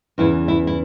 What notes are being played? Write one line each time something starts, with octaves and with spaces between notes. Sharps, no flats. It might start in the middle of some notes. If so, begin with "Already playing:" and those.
E2 C#3 E3 E4
E4
E4